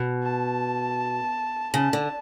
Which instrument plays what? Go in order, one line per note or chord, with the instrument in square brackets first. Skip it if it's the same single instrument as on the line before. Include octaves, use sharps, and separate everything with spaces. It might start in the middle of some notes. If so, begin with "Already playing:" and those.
Already playing: [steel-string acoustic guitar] B2
[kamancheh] A5
[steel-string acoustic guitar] C#3 [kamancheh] A5
[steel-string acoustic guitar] D3